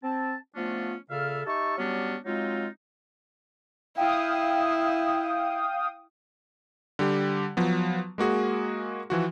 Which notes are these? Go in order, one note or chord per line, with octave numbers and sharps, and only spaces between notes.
C4 A5
F3 A3 B3 C#4 D4 F4
A#2 C#3 A4 E5 F5 F6
D#4 G4 E5 A5 C#6
F#3 G3 B3 C#4 D4 G4
F#3 G#3 C4 D#4 F4
E4 F5 G5 D#6
D3 G3 G4
F3 F#3 B3
G#3 A#3 F#4 G#4
E3 F3 F#4